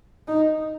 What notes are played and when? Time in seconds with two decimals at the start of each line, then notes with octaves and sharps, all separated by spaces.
0.27 D#4